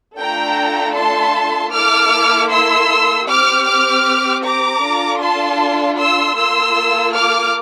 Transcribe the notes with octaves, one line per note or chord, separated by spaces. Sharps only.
A3 D4 F4 A4 G5 A#5
A5 C6
A#3 E4 A4 D6 F6
C6 E6
C4 G4 D6 F6
D6 F6
A#5 D6
D4 F4 A4
A5 C6
C6 E6
A#3 F4 A4 C6 E6
D6 F6